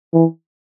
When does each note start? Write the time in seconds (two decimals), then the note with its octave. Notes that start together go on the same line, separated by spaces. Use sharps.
0.14 E3